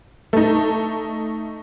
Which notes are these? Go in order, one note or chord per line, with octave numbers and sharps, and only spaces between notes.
A3 D#4